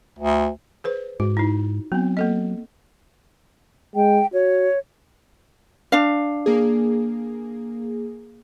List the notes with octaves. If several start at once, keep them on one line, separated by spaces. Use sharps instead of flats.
D2
G#4 B4 C5
G#2 F#4
D#4 E4
F#3 B3 C4
A#3 A4 D#5
G#3 G5
F#4 C#5
D4 F5
A#3 G#4